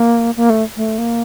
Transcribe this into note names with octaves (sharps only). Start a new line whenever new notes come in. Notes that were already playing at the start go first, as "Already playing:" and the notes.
Already playing: A#3
A#3
A3
A3
A#3